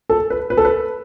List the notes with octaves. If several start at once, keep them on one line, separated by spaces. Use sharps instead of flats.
A4
B4
B4
A4
B4